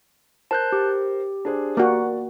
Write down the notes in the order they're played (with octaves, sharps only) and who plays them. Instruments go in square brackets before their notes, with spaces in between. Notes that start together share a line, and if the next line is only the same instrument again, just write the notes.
[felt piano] A#4 C5 [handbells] A5 F#6 G6
[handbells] G4
[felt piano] D4 G#4 C5
[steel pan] A#3 F#4 [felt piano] D5